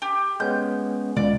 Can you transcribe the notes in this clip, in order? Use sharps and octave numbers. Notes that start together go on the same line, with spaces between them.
G4
G#3 B3 C#4 G6
C#2 D5